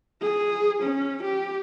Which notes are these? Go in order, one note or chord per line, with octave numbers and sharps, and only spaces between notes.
G#4
C#4
G4